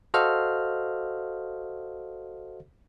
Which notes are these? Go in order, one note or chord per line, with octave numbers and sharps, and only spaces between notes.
F#4 A4 C5 D#5 F5 F6